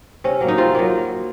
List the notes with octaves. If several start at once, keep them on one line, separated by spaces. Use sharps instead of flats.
C3 C#4
F#3 A#3
D#4
C3 F4
F#3 A#3